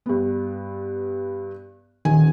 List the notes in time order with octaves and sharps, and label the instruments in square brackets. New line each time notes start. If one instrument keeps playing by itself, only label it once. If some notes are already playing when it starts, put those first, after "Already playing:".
[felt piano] G2 B3
[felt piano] D#1 G#5 [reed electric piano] D#3